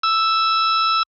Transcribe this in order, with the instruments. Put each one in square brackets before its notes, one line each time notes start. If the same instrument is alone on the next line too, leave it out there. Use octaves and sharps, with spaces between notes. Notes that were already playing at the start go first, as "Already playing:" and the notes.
[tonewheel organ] E6